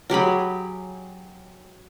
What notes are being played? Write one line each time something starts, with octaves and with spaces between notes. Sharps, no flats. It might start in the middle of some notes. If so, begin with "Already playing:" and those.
F#3 G4 G#4 B5